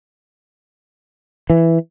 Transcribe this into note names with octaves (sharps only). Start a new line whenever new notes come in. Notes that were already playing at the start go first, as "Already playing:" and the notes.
E3